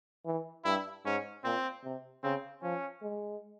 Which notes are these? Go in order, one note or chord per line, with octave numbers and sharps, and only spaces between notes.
E3
G2 E4
G#2 C#4
A#2 C4
C3
C#3 C4
F3 C#4
G#3